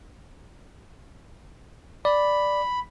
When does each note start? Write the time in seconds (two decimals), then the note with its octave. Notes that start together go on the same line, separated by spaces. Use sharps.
2.05 D5 B5